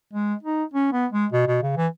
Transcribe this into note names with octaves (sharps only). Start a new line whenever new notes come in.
G#3
D#4
C#4
B3
G#3
B2
B2
C#3
E3